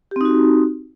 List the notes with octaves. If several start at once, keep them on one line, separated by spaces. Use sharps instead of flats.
C4 D#4 F#4 G4